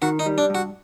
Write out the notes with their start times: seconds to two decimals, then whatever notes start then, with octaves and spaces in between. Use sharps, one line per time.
0.02 D#3 F#4
0.19 D#4
0.26 G3
0.38 D4
0.50 G2 F#4